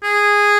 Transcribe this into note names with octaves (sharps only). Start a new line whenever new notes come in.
G#4